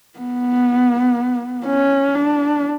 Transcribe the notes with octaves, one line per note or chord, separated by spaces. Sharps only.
B3
C#4
D4